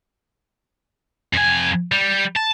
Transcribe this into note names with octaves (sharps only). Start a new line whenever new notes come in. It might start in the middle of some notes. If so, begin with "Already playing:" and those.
F2 G#5
G3
A5